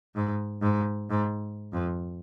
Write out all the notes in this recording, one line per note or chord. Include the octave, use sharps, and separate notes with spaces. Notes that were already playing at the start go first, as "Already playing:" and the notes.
G#2
G#2
G#2
F2